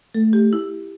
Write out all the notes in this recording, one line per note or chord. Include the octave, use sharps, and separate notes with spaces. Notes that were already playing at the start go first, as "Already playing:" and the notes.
A3 A4
G4
E4